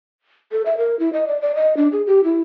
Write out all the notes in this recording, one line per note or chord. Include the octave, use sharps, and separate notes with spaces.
A4
E5
A#4
E4
D#5
D5
D5
D#5
D4
G#4
G4
E4